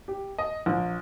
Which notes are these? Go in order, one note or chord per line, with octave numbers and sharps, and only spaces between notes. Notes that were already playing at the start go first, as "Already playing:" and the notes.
G4
D#5
A#1